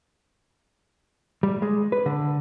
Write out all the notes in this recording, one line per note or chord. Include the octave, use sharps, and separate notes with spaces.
G3
G#3
B4
D3